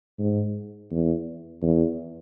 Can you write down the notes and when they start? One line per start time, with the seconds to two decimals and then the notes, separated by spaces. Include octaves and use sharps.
0.19 G#2
0.91 E2
1.62 E2